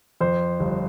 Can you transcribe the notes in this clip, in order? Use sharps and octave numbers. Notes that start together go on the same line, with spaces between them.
F2 C5
G1